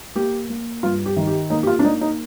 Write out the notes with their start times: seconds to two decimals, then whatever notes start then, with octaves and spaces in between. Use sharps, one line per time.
0.15 A#3 G4
0.49 A#3
0.83 G2 F4
1.06 G4
1.17 D#3
1.27 G4
1.50 A#3 D#4
1.63 G4
1.67 F4
1.79 D4
1.85 A#3 D#4
2.01 D#4